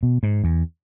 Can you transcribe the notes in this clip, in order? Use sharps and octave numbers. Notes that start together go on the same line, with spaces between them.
B2
G#2
E2